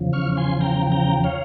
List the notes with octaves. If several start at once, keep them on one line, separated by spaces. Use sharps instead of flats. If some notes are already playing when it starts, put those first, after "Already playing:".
Already playing: E2 C#3 F3
C#6 F6
G#5 C6
G5 A#5
G5 A#5
C#5 F5